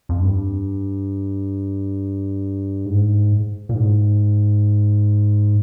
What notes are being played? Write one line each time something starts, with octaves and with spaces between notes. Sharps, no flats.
F2
G2
G#2
A#2
G#2